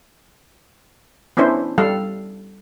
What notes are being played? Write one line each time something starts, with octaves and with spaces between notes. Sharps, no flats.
B3 C#4 D4 E4 C5
G3 A4 F5